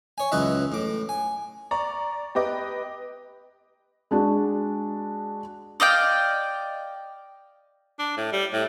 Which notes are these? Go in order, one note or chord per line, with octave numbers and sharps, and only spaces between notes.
C#5 G#5
C#2 F#2 E3 B4 D#5 E5
A2 D6
G#5
D5 A#5 C#6
G4 B4 D#5 D6
G#3 D4 F#4
D5 D#5 F5 G5
D4
A2
G3
A2